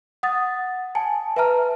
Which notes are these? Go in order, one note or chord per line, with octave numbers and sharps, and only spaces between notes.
F#5 D#6 A6
G#5 A5
B4 E5 A5 A#5 F6